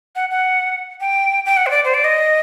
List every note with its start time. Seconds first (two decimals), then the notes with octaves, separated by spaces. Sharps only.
0.16 F#5
0.30 F#5
1.01 G5
1.45 G5
1.57 F#5
1.66 C5
1.71 D5
1.85 C5
1.94 D5
2.04 D#5